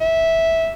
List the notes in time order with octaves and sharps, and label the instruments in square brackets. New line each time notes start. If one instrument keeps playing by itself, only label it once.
[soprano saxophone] E5